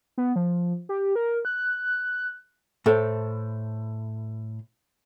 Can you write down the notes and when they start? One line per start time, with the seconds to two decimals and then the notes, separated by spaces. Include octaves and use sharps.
0.18 B3
0.36 F3
0.89 G4
1.16 A#4
1.45 F#6
2.86 A2 A4 C5